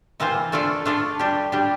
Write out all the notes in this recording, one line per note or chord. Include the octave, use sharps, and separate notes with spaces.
C3 E3 A#3 F4 C5
A3 D4 F4 A4 D5
A3 D4 F4 A4 D5
G3 D4 G4
G3 D4 G4